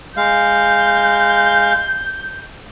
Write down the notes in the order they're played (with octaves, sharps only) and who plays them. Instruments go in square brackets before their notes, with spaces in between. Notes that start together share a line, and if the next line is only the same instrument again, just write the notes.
[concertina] G#3 F5 [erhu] G6